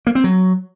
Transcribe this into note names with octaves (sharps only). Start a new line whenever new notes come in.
A#3
C4
F#3